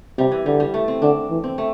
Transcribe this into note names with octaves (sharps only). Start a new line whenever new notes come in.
C3 G3
E3
D3 G3
G3
A3
C4
D3 D4
E3
C4
A3